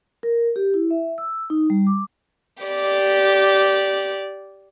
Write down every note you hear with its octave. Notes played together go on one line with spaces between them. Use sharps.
A#4
G4
E4
E5
E6
D#4
G3
D6
G4 D5